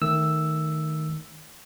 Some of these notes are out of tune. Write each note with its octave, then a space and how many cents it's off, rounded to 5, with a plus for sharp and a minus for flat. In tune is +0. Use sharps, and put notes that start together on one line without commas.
D#3 +0 A3 +0 E6 +0